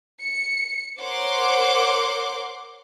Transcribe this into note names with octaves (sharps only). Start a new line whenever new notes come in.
C#7
A#4 C5 C#5 F#5 C6 D6